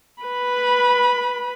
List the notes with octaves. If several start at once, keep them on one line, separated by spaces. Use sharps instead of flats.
B4 B5